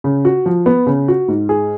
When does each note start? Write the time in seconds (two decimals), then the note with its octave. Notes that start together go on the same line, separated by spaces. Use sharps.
0.04 C#3
0.25 F#4
0.46 F3
0.66 B3
0.87 C#3
1.08 F#4
1.28 G#2
1.49 G#4